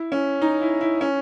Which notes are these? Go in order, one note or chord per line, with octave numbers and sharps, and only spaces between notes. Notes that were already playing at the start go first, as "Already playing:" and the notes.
Already playing: E4
C#4
D#4
E4
E4
C#4